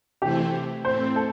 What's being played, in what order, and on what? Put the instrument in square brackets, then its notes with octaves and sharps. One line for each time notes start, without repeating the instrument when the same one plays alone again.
[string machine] C3 E3 A3 C4 E4 [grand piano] G4
[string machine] A2 A3 C4 [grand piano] C5
[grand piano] A4